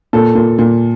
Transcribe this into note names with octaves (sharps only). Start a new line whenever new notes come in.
A#2 A4
A#2
A#2